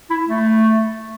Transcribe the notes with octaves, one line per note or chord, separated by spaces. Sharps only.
E4
A3